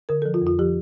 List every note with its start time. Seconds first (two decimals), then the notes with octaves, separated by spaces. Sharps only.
0.09 D3 A#4
0.22 F3 A4
0.34 F4
0.42 F2
0.47 F4
0.59 F3 G4